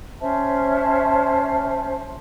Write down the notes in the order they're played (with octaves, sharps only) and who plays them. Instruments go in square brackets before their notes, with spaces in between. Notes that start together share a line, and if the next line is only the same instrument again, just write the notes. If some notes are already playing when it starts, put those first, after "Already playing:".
[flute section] C#4 C5 E5 A5